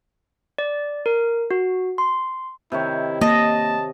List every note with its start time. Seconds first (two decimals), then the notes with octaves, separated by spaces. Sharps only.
0.58 D5
1.06 A#4
1.51 F#4
1.98 C6
2.72 C3 D#3 E4 C#5
3.21 A#3 D#5 A5